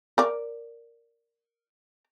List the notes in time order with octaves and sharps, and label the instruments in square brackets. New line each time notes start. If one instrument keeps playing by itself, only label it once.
[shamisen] A#4 D5